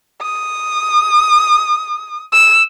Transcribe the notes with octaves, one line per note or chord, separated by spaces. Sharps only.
D#6
E6